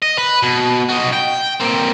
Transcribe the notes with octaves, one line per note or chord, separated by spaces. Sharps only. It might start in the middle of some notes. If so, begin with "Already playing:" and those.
D#5
B4
B2
D#4 F#4
G5
A#3 C4